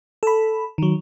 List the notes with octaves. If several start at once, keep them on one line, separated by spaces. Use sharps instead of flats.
A4 B5
D#3 F#3